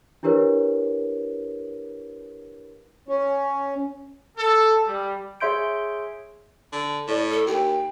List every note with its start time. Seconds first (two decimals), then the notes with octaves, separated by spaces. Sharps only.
0.23 D4 E4 G4 A#4 B4 C#5
3.08 C#4
4.36 A4
4.85 G3
5.40 G#4 C#5 E5 C6 G6 D7
6.72 D3
7.08 A2 D5
7.30 A4
7.47 D#2 G5